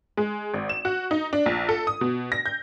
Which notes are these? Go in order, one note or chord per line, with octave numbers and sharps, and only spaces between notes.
G#3
G#1
E7
F#4
D#4
D4
A#1
A4
D#6
B2
A#6
G6